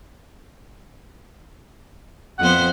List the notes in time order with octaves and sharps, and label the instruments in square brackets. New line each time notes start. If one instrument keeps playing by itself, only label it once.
[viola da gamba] F2 B3 C5 [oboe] F#5